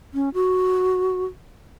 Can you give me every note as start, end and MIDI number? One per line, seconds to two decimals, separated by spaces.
0.14 0.29 61
0.34 1.24 66